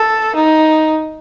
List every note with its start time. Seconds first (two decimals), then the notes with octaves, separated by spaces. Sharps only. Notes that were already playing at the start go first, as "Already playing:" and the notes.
Already playing: A4
0.36 D#4